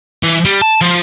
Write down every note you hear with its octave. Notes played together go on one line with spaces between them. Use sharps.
E3
G3
A5
F3